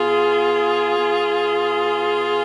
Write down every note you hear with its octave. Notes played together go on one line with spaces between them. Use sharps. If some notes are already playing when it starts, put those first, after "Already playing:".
Already playing: B2 F4 G#4
B2